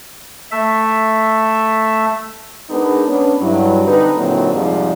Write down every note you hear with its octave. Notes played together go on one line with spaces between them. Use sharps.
A3 E5
G#3 B3 D4 D#4 G#4 A#4
B3 C#4 D4
G2 F#3 E4
D3 C4 D4 D#4 B4
A#2 D3 D#3 F#3 C4 E4
F2 G#2 C3 F3 G3 D5